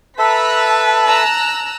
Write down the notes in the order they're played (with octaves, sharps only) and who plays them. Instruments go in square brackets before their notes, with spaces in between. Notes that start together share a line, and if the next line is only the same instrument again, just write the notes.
[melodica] A4 E5 [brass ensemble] B4 [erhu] A5 [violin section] A#5 B6
[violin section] A#5 E6 F#6